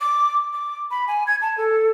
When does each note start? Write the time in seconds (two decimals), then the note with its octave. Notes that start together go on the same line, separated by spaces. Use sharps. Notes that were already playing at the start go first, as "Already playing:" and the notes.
0.01 D6
0.53 D6
0.91 B5
1.08 G#5
1.27 G#6
1.42 A5
1.58 A4